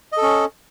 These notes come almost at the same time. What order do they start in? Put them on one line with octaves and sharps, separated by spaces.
D#5 A4 C#4